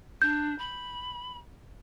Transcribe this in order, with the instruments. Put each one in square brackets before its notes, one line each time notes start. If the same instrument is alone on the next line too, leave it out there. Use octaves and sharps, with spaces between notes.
[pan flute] D4 [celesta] G6
[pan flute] B5